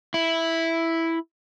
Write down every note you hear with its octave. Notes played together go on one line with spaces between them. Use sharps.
E4